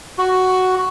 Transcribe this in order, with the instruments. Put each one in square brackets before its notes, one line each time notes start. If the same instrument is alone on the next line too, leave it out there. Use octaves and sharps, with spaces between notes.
[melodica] F#4